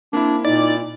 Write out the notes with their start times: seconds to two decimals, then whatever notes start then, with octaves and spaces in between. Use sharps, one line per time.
0.13 A#3 C4 D4 E4
0.45 A#2 D#4 D5